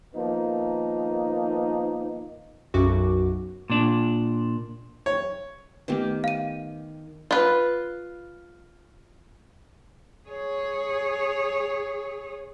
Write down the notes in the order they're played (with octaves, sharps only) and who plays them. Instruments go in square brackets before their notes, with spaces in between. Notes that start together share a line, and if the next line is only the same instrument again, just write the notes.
[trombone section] D#3 F3 A#3 B3 D#4
[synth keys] B1 F#2 F#4 D6
[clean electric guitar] A#2 D4
[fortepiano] C#5
[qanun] D#3 G4 [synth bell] A3 B3 B4
[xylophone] F5 D#7
[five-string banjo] F4 B4
[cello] G#4 C#5